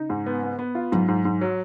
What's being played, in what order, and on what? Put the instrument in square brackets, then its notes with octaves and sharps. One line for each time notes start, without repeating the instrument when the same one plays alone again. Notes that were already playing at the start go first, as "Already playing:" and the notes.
Already playing: [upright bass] C#3 [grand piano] D#4
[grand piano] G#2
B3
B3
B3
F4
[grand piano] G#2 [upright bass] F#3
[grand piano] G#2
G#2
F#3